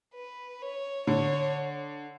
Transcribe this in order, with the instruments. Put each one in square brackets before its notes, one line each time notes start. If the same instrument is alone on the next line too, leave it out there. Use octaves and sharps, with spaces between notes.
[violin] B4
C#5
[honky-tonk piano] D3 [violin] C#5